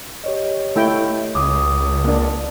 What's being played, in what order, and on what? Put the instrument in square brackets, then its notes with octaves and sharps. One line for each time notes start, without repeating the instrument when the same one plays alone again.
[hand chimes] G4 C#5 D#5
[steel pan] A3 E4 G5
[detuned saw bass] C#2 [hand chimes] D6 D#6
[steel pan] A#3 D4